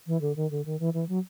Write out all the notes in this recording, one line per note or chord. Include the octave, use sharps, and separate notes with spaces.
E3
D3
D#3
D3
D#3
E3
E3
F#3